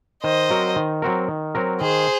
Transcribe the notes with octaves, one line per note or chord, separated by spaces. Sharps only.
D#3 C5 D#5
F#3 C4 F#4 A#4
D#3
F#3 C4 F#4 A#4
D#3
F#3 C4 F#4 A#4
D#3 G#4 C5